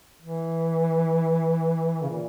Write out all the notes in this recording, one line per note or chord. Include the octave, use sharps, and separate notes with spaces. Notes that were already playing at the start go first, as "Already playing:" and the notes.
E3
C#3
A#2